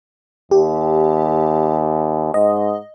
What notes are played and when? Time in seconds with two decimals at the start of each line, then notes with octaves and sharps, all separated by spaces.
0.51 D#2 G4
2.34 G#2 D#5